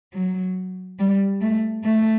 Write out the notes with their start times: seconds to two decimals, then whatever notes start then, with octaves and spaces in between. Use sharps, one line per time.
0.13 F#3
0.99 G3
1.41 A3
1.84 A3